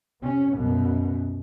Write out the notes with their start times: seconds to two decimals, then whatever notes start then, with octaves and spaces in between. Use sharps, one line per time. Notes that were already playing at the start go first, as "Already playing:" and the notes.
0.22 C3 C#4
0.52 C2 F#2 B2